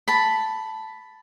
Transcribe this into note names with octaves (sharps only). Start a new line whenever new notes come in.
A5 B5